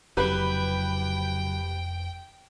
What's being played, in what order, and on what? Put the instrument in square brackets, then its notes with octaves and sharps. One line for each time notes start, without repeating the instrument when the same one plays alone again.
[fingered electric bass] F1 [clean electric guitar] C#2 F#3 E4 [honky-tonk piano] G4 B4 [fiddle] G5